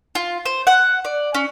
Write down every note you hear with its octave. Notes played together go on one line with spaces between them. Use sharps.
F4
C5
F#5
D5
C#4